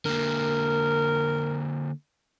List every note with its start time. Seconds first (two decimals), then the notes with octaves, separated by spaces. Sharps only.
0.05 D3 A#3 A#4